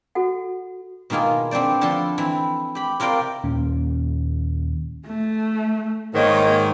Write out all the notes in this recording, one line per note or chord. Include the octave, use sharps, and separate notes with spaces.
F#4 A4 F#5
B2 D#3 A#3 F4 G#4
B3 C4 D4 C5 D5
D3 F3 B3 A4 A5 C6
E3 C4 E4
G4 B5
C3 F4 A#4 D5 G5 C6
D#2 A#2 C#4
A3
G#2 D#3 A#3 C#5